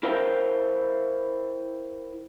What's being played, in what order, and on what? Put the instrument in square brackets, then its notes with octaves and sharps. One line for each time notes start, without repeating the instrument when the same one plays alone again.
[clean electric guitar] E4 A#4 C5 F5 G5